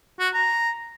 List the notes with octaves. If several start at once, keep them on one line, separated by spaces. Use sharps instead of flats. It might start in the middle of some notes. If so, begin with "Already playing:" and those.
F#4
A#5